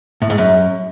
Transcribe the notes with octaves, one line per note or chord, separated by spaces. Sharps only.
A2
G#2
F#2